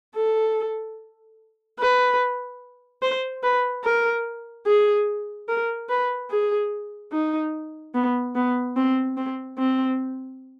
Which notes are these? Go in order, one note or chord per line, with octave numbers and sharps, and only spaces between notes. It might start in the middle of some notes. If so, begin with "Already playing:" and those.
A4
B4
C5
B4
A#4
G#4
A#4
B4
G#4
D#4
B3
B3
C4
C4
C4